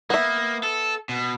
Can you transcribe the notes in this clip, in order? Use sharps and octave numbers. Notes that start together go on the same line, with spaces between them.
A#3 B3 E5
A4
B2